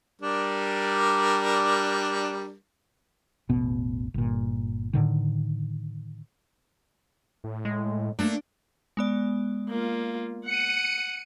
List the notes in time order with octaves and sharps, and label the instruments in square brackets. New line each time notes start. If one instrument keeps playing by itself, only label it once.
[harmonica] G3 D4 A#4
[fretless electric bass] E1 A1 B2 B3
G1 A#2
A2 D3 D#3
[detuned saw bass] A2
[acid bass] G#3
[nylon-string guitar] A3 A#3 [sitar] D4
[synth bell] G#3 B3 D5
[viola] A#3 F4
[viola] F#5 [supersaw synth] C#7 D#7